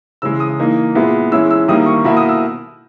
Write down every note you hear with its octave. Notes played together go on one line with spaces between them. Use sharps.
C#3 E3 G#3 E6
D#6
E3 A#3 D#4
A#2 G#3 B3 E4
E3 G#3 C#4 E4 E6
E6
D#3 G3 A#3 E4 D#6
C#6
B2 A#3 E4 B5
D#6
E6